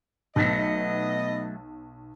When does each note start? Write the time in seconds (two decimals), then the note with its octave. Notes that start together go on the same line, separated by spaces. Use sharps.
0.36 B1 F#3 A3 B3 D#5 A#6